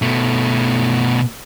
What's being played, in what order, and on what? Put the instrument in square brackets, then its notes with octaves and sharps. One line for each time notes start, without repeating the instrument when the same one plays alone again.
[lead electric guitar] B2 A3